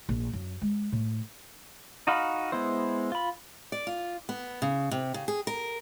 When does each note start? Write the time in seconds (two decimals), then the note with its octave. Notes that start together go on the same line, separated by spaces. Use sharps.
0.09 A#1
0.33 F#2
0.62 G#3
0.92 A2
2.07 D#4 F#4 F5 B5
2.52 G#3 B3 E4 C5
3.12 F4 B5
3.72 D5
3.87 F4
4.29 B3
4.62 C#3
4.91 C3
5.14 C#3
5.28 G#4
5.47 A#4